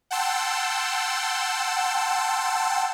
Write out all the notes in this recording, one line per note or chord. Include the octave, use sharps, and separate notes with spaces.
F#5 G5 A5 C6 E6